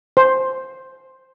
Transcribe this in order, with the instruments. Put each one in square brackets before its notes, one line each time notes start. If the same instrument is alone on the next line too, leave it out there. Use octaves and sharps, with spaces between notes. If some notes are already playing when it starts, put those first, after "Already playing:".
[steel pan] C5